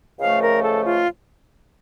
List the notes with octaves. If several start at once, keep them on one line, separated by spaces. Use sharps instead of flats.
C#2 C#3 F3 A3 F5
A#4
A4
F4